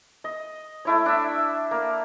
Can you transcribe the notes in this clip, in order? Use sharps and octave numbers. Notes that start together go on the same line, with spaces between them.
D#5
A3 E4 C#5
D4 E5
A#3